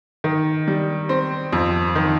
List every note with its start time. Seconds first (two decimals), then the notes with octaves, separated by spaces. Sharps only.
0.24 D#3
0.68 G3
1.09 C4
1.53 F2
1.95 D#3